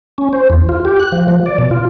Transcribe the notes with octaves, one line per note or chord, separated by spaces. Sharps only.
C#4
C5
E2
F4
G4
F#6
F3
F3
D5
B2
F4